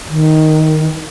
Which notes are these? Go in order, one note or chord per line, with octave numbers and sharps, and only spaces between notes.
D#3